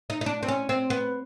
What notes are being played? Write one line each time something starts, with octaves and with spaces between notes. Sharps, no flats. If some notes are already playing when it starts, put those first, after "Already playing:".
D#4
D#4
D4
C4
C#4
C4
B3